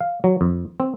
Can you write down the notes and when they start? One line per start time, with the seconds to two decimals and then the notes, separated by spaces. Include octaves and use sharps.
0.01 F5
0.24 F#3
0.41 F2
0.80 C4